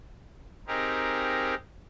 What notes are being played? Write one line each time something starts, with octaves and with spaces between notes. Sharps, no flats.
C4 D#4 G4 G#4 A#4